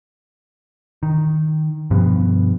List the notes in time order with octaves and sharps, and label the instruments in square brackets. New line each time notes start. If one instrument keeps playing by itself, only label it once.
[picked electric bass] D#3
G2 B2 F3 B3